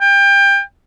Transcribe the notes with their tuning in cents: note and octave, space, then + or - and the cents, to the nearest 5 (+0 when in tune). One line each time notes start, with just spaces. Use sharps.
G5 +25